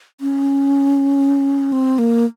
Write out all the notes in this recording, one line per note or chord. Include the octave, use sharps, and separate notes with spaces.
C#4
C4
A#3